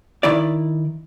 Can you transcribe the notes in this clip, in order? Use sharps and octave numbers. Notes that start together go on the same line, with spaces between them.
D#3 E4 D5